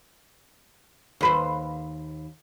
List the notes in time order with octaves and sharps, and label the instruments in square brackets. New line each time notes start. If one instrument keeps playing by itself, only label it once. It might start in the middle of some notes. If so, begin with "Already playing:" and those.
[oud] D#2 B4 C5